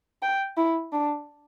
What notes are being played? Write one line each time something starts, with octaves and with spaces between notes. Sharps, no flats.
G5
E4
D4